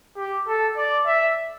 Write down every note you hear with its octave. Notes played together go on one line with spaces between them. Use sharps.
G4
A4
D5
E5